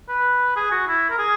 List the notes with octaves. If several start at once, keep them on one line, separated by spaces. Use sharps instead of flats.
B4
G#4
F#4
E4
A#4
G#4